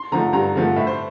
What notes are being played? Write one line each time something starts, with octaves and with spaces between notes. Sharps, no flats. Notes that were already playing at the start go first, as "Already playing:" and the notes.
Already playing: C6
D3 F3 A3 A#5
G2 A#5
D3 F3 A3
A2 E5
C5